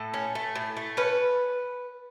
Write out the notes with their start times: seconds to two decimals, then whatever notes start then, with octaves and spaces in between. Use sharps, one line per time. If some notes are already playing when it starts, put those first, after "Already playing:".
Already playing: A2 A4
0.14 C#4
0.35 A3
0.55 A2
0.77 A3
0.97 C#4 B4